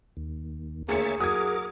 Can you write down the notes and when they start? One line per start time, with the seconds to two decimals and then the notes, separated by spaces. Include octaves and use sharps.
0.17 D#2
0.89 D2 A#3 G#4 C#5 E5 A6 C#7
1.20 F#3 A#4 D6 D#6 G#6